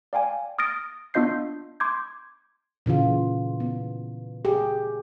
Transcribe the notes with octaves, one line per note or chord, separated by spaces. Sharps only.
D5 F5 G5 G#5
D#6 F6 A6 A#6 D7
B3 D4 F4 D#5 G6 C7
C6 D6 G6 G#6
A#2 C#3 E3 F4
B3
G4 G#4